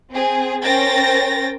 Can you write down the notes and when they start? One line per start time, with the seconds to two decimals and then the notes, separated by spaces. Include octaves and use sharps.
0.11 C4 G#4
0.63 C#4 A#4 C5 G5 A6 A#6